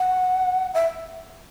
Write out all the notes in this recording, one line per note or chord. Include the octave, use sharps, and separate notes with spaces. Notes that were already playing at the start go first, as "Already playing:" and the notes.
Already playing: F#5
E5